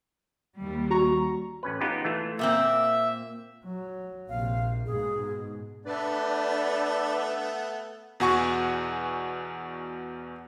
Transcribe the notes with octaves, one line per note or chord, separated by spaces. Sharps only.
D#2 G3
F#4 A#5 C#6
A1 C#4 B4
B3 D#4 F4 G4
E3 A3 F4
A#2 A#3 C4 E5
F#3
A#1 C3 F5
G#2 B2 G#4
A3 B3 D4 B4 D5
E2 B2 F#4 F#5 G#5 C#6